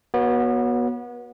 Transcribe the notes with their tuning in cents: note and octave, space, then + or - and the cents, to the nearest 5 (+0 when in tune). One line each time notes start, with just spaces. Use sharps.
B3 -30 F#4 +0 C#5 +0